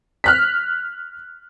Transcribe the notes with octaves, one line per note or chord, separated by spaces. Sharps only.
F6 F#6 B6